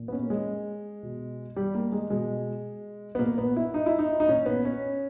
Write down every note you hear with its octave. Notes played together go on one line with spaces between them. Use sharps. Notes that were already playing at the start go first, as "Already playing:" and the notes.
Already playing: A#2
B3
C#4
A#3
G#3
B2
G3
A#3
G#3
B2 G#3
B3
A#2 A#3
B3
E4
D#4
E4
D#4
D#4
A#2 C#4
B3
C#4